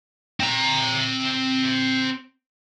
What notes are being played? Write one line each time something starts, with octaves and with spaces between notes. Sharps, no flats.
C4 A#5